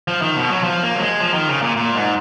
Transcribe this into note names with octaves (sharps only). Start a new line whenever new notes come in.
F3
D#3
B2
F#3
F3
A#3
F#3
G#3
F3
D#3
C#3
A#2
A#2
G#2